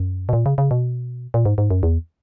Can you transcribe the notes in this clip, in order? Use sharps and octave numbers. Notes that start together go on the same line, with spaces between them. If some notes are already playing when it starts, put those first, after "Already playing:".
Already playing: F#2
B2
A#2
C#3
C#3
B2
A#2
G#2
G#2
F#2
E2